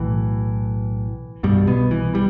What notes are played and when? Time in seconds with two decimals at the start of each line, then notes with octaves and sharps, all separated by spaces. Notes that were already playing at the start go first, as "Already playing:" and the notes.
Already playing: B1 A2 E3
1.43 C2 G2 B2 G3
1.67 B2 B3
1.91 E3
2.15 G3